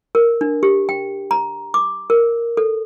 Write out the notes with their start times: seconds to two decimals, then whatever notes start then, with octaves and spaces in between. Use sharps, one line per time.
0.15 A#4
0.41 D4
0.63 G4
0.89 G5
1.31 A#5
1.74 D6
2.10 A#4
2.57 A4